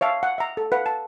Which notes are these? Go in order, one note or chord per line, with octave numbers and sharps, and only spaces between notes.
C#5 E5 F5 A5
F#5
E5 A#5
A4
B4 F5 F#5
A5